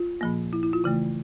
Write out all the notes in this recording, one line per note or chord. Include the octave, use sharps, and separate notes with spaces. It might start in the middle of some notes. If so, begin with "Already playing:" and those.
Already playing: F4
A#2 F3 A#3
E4
E4
F4
C#3 E3 A3